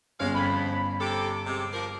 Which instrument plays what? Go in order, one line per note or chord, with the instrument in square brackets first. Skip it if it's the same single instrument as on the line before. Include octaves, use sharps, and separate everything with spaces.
[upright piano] G1 C#4 [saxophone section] G#3 F5
[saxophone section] F2 [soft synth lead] B5
[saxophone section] C3 A4 [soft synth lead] D6
[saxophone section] C3 G#3
F3 A#4